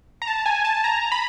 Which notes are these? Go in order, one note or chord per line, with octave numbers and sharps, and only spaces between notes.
A#5
A5
G#5
A5
A#5
B5